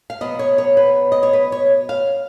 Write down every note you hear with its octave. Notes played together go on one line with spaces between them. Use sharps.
F5
B2 F#3 B3 D#5
C#5
C#5
B4
D#5
C#5
B4
C#5
F5